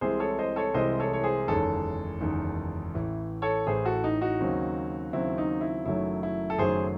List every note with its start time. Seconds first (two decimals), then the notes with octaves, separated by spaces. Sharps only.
0.01 C2 C3 E3 G#3 G#4 C5
0.20 A4 C#5
0.39 C5 D#5
0.56 A4 C#5
0.74 C2 C3 E3 G#3 C5 D#5
1.00 A4 C#5
1.13 C#5
1.24 G#4 C5
1.48 F#1 E2 D#3 G#3 A4 C#5
2.20 F#1 E2 D#3 G#3
2.94 A1 A2 E3
3.42 A4 C#5
3.66 A1 A2 E3 G#4 C5
3.85 F#4 A4
4.04 D#4
4.21 D#4 F#4
4.40 D#2 C#3 F#3 C4
5.13 D#2 C#3 F#3 C4 E4
5.38 D#4
5.61 E4
5.85 F#1 F#2 D#3 F#3 A3 E4
6.23 E4
6.50 A4
6.58 F#1 F#2 D#3 F#3 A3 G#4 C5